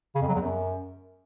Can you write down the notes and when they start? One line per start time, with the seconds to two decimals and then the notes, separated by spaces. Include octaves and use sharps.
0.15 C#3
0.22 F2
0.28 F#3
0.35 E2
0.41 F#2